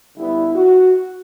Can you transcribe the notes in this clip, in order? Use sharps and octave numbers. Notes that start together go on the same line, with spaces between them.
D3 G3 B3 E4
F#4